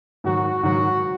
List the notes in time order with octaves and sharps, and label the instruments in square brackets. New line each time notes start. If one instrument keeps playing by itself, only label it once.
[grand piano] G#2 D#3 F#3 [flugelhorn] F#4
[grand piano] G#2 D#3 F#3 [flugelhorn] F#4